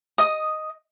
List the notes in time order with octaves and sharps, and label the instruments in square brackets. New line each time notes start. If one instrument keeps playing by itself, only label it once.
[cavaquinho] D#5 D#6